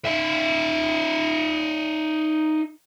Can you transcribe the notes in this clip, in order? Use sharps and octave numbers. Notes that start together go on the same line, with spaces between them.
D#4 E5